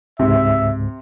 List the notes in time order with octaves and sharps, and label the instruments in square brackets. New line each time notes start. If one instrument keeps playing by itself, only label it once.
[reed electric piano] C#2 G#2 [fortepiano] C3 [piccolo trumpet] E5